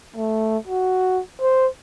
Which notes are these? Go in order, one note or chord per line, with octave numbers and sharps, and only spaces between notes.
A3
F#4
C5